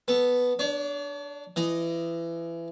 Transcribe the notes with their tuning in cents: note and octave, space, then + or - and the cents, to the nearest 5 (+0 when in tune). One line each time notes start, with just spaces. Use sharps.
B3 +0 A4 +0
D4 +0 C#5 +45
E3 +25 D#5 +0